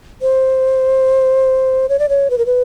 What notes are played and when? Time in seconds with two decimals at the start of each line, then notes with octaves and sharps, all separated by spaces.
0.22 C5
1.89 C#5
1.99 D5
2.09 C#5
2.30 B4
2.38 A#4
2.46 B4